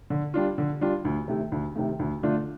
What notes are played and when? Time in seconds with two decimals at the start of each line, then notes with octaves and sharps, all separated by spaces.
0.10 D3
0.34 G3 D4 F4
0.58 D3
0.81 G3 D4 F4
1.05 D2
1.28 C3 D#3 A3
1.52 D2
1.76 C3 D#3 A3
1.99 D2
2.23 D3 A3 D4 F4